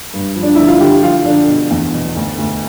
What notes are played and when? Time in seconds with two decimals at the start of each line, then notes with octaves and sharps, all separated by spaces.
0.14 G2
0.36 F3
0.43 D4
0.55 D3 E4
0.68 F4
0.81 D3 G4
1.03 F3 F4
1.26 D3 D4
1.48 B2
1.71 E2
1.94 B2
2.16 D2
2.38 D2